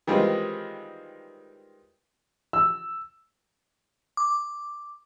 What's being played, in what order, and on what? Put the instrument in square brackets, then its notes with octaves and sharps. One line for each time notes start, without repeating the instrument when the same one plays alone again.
[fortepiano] D#3 E3 G3 G#3 C4 F4
[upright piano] E6
[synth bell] D6